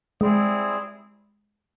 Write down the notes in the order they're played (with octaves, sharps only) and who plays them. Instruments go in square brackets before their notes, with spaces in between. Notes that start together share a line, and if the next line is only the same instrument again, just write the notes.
[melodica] G3 C4 E4 G#4 [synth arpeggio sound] G#3